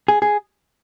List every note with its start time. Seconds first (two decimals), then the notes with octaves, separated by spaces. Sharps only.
0.08 G#4
0.22 G#4